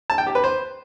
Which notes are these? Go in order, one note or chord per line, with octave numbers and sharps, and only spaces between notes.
A5
G5
G4
B4
C5